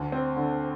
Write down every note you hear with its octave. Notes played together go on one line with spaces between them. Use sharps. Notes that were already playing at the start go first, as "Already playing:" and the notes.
Already playing: D2
C4
D3